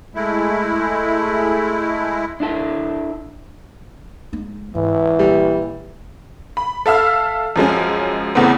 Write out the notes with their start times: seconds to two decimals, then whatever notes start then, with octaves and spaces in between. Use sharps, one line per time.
0.15 G#3 A3 E4
2.40 D4 E4 A4
4.33 G#3 D#4
4.75 G#2 E3
5.19 A#1 G3
6.57 B5
6.86 A4 E5 F5 E6 F6
7.56 F#2 F3 G#3 C#4
8.35 E2 A2 C#3 B3 C4